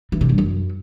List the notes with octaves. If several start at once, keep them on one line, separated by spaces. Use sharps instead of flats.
E3
C3
G2
F#2